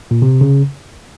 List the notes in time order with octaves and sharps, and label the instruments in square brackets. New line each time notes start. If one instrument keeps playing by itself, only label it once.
[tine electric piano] A#2
C3
C#3